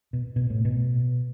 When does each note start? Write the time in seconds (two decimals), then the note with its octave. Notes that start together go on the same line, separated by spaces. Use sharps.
0.13 B2
0.36 B2
0.50 A2
0.65 B2